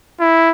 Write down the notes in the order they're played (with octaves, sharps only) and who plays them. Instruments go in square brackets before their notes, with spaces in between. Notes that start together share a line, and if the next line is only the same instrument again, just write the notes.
[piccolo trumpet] E4